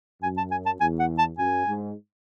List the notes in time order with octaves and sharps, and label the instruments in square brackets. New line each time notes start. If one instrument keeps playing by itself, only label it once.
[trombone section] F#2 [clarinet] G#5
[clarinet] A5
G#5
A5
[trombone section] E2 [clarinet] G#5
[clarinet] F#5
A5
[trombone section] F#2 [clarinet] G#5
[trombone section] G#2